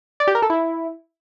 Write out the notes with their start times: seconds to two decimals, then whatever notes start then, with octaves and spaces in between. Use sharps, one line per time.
0.20 D5
0.27 G4
0.35 A#4
0.42 A4
0.50 E4